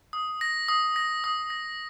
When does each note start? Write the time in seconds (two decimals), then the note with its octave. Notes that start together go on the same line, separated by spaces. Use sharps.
0.13 D#6
0.41 A#6
0.68 D#6
0.96 A#6
1.24 D#6
1.50 A#6